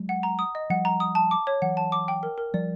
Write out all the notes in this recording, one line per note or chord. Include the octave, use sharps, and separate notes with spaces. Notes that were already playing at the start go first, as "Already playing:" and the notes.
Already playing: F#3 G#3
F#5
A#5
D#6
D#5
F3 G3 F#5
A#5
D#6
A5
D6
C#5
E3 F#3 F#5
A5
D6
G5
A#4
A#4
F3 G3 D5